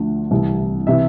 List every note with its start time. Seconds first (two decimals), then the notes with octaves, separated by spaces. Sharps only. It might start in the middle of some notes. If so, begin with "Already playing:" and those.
Already playing: D2 D3 F3
0.31 C2 C3 E3
0.87 C3 E3 E5